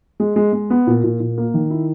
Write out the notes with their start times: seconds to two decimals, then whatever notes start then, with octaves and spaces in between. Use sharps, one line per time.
0.20 G#3
0.36 G#3
0.53 G#3
0.70 B3
0.87 A#2
1.04 A#2
1.20 A#2
1.38 A#3
1.54 D#3
1.70 E4